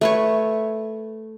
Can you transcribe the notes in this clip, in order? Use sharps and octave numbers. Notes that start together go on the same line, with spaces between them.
A3 B4 C#5